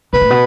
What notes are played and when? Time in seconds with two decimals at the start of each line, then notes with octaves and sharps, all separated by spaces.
0.13 B2 B4
0.21 A2
0.30 B2